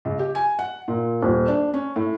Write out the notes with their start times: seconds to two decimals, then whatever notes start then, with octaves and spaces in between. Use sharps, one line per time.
0.05 C#2
0.19 G4
0.35 G#5
0.59 F#5
0.88 A#2
1.23 D#1
1.48 D4
1.74 C#4
1.96 A2